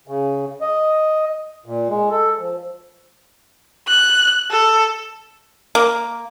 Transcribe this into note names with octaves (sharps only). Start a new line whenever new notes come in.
C#3
D#5
A#2
G#3
A4
F3
F#6
A4
A#3